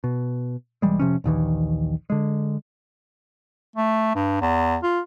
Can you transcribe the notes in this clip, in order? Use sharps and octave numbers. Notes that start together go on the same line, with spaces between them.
B2
B1 E3 G3 G#3
F1 C3 F3 C#4
A#1 D#2 D#3 E3
D3 G#3
A3
G2
E2
F4